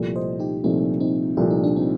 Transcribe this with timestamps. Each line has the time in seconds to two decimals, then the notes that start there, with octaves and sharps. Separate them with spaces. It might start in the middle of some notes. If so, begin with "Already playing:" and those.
Already playing: C2 A#2 F3 A3
0.16 C5 D#5
0.39 D#4 G4
0.64 C2 A#2 F3 A3 C4 D#4
1.00 C4 D#4
1.37 C2 A#2 F3 A3 F4
1.50 D#4
1.64 D4
1.76 C4 D#4